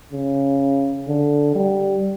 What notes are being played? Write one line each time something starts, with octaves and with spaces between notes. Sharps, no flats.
C#3
D3
G3